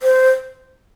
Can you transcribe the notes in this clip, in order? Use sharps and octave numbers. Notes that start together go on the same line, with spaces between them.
C5